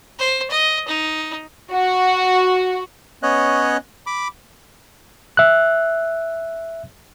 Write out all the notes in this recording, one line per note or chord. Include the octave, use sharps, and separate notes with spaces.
C5
D#5
D#4
F#4
B3 C#4 C#5 D#5 F#6
B5 D6
E5 F#6